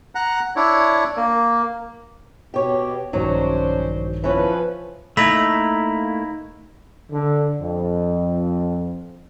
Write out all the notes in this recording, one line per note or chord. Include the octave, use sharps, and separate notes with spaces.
F#5 A#5
D4 E4 C#5
A#3
B2 G4 C#5
A#1 G2 D#3 F#3 C#4 D4 C5 C#5
E3 F3 C#4 B4
A3 A#3 D#4 E4 A#5 B5
D3
F2